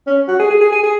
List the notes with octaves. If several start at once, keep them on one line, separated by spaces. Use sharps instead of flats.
C#4
F#4
G#4
G#4
G#4
G#4
G#4